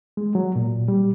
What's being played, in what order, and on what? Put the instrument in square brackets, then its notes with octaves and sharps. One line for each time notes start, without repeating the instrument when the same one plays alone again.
[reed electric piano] G#3
F#3
A#2
G3